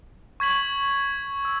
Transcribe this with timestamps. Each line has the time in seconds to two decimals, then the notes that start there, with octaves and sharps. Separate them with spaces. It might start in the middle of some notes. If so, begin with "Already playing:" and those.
0.40 C#6 G#6 B6 F#7
1.45 E6